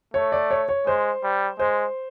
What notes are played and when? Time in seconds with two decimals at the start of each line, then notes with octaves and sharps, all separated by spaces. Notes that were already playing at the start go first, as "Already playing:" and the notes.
0.14 A3 C#5
0.32 D5
0.51 C#5
0.69 C#5
0.86 G#3 C5
1.24 G3
1.59 G#3 C5